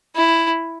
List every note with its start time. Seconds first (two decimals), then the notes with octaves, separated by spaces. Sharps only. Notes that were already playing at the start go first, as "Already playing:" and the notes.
0.16 E4